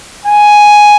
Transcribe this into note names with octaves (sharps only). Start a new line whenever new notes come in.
G#5